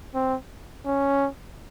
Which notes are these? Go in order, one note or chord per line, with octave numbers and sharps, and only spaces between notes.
C4
C#4